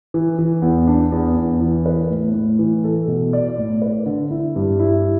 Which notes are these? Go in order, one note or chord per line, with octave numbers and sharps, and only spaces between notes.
E3
E3
E2
D4
E2
E2
E3
B4
A2
A2
E3
A4
B2
D5
A2
B4
D3
E4
G2
E4